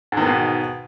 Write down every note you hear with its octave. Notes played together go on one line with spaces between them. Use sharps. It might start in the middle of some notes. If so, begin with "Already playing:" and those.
G#2 B2 D#3 B3